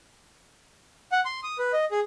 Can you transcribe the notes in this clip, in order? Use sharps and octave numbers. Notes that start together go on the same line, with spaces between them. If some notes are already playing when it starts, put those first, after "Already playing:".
F#5
C6
D#6
B4
D#5
G#4